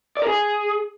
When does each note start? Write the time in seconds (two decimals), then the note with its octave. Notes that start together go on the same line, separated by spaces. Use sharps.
0.17 D5
0.22 A#4
0.27 G#4